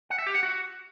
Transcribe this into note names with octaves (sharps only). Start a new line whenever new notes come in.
F#5
E5
G4
F#5
F#4